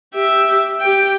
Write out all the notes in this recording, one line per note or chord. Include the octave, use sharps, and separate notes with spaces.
G4 E5
G4 G5